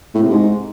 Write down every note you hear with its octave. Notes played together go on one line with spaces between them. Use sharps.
A2
C3
G#2